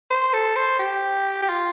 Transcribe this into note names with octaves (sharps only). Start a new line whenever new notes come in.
C5
A4
C5
G4
G4
F4